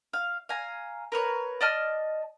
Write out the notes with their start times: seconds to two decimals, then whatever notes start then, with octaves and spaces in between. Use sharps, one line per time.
0.13 F5
0.49 F5 G#5 A#5
1.12 A#4 B4 C#5
1.61 D5 D#5 A5 F6